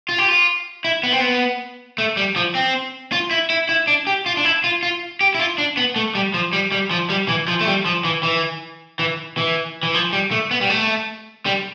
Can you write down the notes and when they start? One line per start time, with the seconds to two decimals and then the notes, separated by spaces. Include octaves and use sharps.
0.09 F4
0.18 G4
0.29 F4
0.85 E4
1.03 B3
1.12 C4
1.21 B3
1.98 A3
2.17 G3
2.36 F3
2.55 C4
3.12 F4
3.31 E4
3.50 E4
3.69 E4
3.88 D4
4.07 G4
4.26 F4
4.37 D4
4.45 E4
4.64 F4
4.83 F4
5.21 G4
5.35 E4
5.40 F4
5.58 D4
5.77 B3
5.96 A3
6.15 G3
6.34 F3
6.53 G3
6.72 G3
6.91 F3
7.10 G3
7.29 E3
7.48 F3
7.61 A3
7.67 G3
7.86 F3
8.04 E3
8.23 E3
8.99 E3
9.37 E3
9.83 E3
9.94 F3
10.13 G3
10.31 A3
10.51 B3
10.61 G3
10.70 A3
11.46 G3